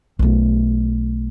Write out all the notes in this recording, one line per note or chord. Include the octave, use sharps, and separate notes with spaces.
B1 A3